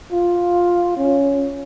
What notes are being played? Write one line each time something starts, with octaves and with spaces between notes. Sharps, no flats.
F4
C#4